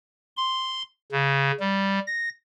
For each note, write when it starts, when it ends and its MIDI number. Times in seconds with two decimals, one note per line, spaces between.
0.37 0.82 84
1.12 1.51 49
1.60 1.99 55
2.07 2.29 94